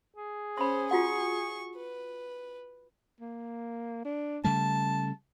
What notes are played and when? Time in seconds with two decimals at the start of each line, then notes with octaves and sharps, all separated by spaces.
0.16 G#4
0.57 C#4 C5 B5 C6
0.91 F4 F#4 F#5 C#6
1.75 B4
3.20 A#3
4.05 D4
4.44 C#3 G3 A3 A5